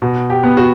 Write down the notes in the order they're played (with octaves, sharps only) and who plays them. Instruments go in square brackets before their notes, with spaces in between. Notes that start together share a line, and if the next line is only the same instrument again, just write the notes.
[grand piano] B2
G4
B3
F#4